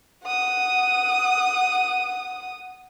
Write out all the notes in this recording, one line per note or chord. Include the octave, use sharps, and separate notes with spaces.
F#5 D#6